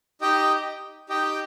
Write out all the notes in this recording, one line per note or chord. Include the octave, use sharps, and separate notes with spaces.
D#4 G4 D#5 G5
D#4 G4 D#5 G5